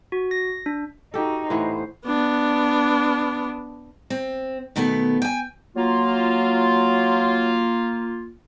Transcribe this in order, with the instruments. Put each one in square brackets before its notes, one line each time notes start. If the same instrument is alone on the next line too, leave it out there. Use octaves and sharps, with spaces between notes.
[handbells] F#4
A#6
D4
[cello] D#4 F#4 [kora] G4 A4
[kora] A2 E3 B3 [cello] C5
[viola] B3 D4
[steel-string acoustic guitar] C4
B2 D#3 A3 B3
G5 G#5
[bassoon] F#3 [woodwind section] A#3 F4